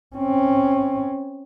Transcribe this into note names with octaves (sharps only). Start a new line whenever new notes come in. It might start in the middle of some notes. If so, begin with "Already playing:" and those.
C4 C#4